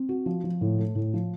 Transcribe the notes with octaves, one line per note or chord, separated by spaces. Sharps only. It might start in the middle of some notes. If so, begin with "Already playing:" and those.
Already playing: C4
F#4
F3
F3
A2
A3
A2
F3